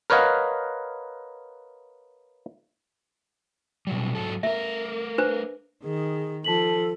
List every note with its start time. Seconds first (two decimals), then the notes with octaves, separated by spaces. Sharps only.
0.10 A#4 B4 C#5 D#5 F5 F#5
3.87 B2 F#3 G3
4.15 G#2 F#3 A4
4.43 A3 A#4 E5
5.18 D4 B4 C5
5.83 D#3 G#4
6.44 F3 A4 A5 B6 F#7